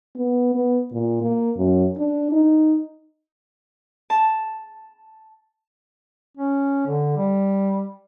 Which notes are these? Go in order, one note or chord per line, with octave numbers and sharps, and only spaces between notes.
B3
B3
A#2
A#3
F#2
D4
D#4
A5
C#4
D3
G3